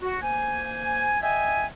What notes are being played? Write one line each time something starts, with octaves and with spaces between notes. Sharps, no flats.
F#4
A#3 C5 G#5
D#5 E5 G5 G#5